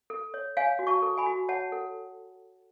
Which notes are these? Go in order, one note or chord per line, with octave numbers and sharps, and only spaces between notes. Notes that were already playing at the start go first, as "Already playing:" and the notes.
A4
C#5
C#5 F5 G#5
F#4
A5 C#6
A4
G#5 B5
F#4
C#5 F#5 A5
A4